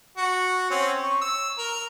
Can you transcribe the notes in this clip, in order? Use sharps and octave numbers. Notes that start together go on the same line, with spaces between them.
F#4
C4 C#4
C#6
E6
A#4